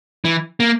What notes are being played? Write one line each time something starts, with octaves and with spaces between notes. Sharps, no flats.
E3
A#3